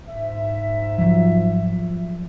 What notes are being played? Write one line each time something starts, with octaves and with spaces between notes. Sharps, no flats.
G#2 E5
F3 F#3